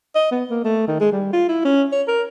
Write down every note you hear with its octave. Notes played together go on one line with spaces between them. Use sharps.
D#5
B3
A#3
A3
D#3
G#3
G3
F4
E4
C#4
C#5
A#4